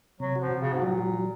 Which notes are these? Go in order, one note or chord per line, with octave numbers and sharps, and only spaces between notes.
C3 F#3
F#4
F3
C3
C#3
F#4
G#2
A#2 F#3
F#3
F#3